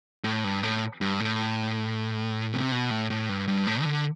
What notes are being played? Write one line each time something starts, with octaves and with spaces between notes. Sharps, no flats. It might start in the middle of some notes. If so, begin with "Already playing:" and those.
A2
G2
A2
G2
A2
C3
B2
A2
A2
G2
G2
A2
E3
D3